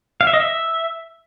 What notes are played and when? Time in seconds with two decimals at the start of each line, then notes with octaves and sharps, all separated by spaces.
0.21 F5
0.27 E5
0.33 D#5
0.40 E5